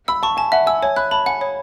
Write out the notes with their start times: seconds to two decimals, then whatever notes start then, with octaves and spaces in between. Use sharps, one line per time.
0.08 B5 E6
0.23 A5 C#6
0.37 G#5 A5
0.52 E5 F#5
0.67 G#5 E6
0.82 C#5 G#5
0.96 B5 F#6
1.11 A5 B5
1.26 F#5 G#5
1.41 C#5